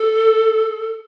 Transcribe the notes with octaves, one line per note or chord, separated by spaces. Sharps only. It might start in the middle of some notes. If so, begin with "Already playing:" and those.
Already playing: A4